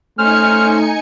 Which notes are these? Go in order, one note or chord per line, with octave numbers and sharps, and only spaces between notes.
A3 C#4 D#4 C5 G#5 F6 C#7